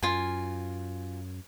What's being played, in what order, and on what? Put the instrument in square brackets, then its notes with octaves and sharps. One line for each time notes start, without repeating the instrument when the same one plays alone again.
[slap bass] F#2 [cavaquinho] F4 G#5